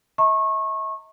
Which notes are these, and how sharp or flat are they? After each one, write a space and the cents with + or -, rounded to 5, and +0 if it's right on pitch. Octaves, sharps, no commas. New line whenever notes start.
E5 -45 A#5 -40 C#6 -30